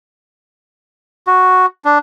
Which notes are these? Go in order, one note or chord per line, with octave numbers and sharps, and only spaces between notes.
F#4
D4